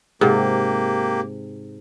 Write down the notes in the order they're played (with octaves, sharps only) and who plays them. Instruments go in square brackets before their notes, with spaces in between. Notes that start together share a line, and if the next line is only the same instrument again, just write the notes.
[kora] G#2 C3 [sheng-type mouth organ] A#3 G4